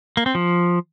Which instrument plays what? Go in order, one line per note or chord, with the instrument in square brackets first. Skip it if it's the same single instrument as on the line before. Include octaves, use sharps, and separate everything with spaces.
[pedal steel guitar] A#3
C4
F3